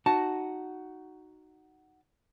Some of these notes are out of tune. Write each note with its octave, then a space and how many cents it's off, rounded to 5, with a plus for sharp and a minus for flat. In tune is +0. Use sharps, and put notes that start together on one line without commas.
D#4 -5 F#4 +5 A5 +0